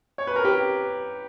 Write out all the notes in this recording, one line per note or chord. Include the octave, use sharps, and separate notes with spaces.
C#5
B4
A#4
G4 B4